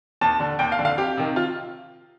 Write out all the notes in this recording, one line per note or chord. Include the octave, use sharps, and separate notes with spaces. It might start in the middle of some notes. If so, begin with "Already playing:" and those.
D#2 A5
D3
D#2 G5
F5
D3
F5
F2 G4
C3 D#3
F4